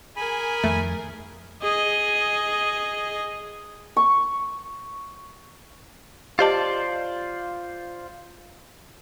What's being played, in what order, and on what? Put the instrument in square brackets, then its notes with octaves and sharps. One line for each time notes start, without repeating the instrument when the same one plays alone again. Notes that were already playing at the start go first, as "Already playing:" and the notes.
[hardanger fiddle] G#4 A#4 [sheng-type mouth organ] G#5 B5
[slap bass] F2 D#3 [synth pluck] A3
[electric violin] G#4 D#5
[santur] C#6
[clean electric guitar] F4 C5 D5 [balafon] G4 D#5 A5